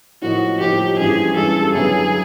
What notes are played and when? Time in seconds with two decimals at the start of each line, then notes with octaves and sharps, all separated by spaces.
0.22 A2 F3 A#3 D#4 F#4
0.60 A2 F3 A#3 D#4 G4
0.98 G2 E3 G#3 C#4 G#4
1.36 G2 E3 G#3 C#4 A4
1.74 F#2 D3 F#3 B3 E4 G#4